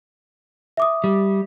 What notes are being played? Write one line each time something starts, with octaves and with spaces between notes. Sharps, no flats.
E5 D6 D#6
G3